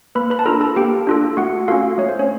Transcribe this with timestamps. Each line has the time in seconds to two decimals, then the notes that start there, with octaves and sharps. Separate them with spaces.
0.15 A#3 B4 B5
0.30 B4 B5
0.39 A5
0.46 D4 F4 A4 A#4 A#5
0.61 A4 A5
0.76 A#3 G4 G5
1.07 D4 F4 A4
1.37 A3 F#4 F#5
1.68 C#4 F4 F#4 A4 F5
1.98 A3 C#5
2.09 C5
2.19 C#4 C#5